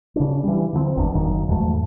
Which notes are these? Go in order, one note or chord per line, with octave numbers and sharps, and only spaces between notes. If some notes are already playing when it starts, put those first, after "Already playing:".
C#3 D4
E3 G3
D3 F3 A3 C4
G1 E2 B3 D4
F#1 D#3 F#3
E2 G#2 F#3 A3